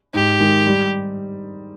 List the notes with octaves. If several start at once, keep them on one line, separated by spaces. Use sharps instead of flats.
G#2 G4
D#3 G#3
G3